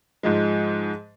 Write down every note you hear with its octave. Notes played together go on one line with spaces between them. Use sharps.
G#2 F3 G#3